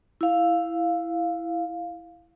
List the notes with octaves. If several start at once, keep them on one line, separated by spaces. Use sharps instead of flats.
E4 F5